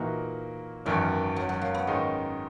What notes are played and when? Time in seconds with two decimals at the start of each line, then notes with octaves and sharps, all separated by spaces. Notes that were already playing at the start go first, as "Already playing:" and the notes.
Already playing: A#2 E3 A#3 D#4 F#4
0.86 G#1 F#2 D#3 E3
1.36 F#3
1.49 F#3
1.61 A#3
1.74 B3
1.87 G#2 D#3 G#3 C#4 D#4